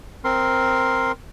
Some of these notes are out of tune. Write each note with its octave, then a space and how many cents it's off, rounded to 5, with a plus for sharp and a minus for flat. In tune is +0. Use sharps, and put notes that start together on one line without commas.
C4 +0 A#4 +0 C6 +0